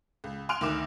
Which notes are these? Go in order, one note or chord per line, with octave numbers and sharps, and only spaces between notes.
C#2
G#5 C6 F6 F#6 D7 F7
D2 D#3 D6 E7